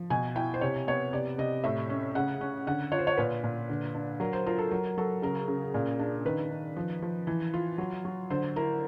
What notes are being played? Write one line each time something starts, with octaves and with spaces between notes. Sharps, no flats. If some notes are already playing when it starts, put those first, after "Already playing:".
Already playing: F3
B2 G#5
E4 G5
C5
C3 C#5
B3 C#5
C3 D5
C3 D#5
A2 E5
C#4
C#3 F#5
C#4
D3 F#5
F4 C#5
C5
C#5
A#2 B4
A#2
D3
D4
F#3 A#4
C5
F4 A#4
A4
F#3 A#4
F#3 A4
C#3 A#4
C#3
A#2
D4
D#3 B4
D#3
F3
F3
E3
F4
F#3
F#3
D3 C5
E4 A#4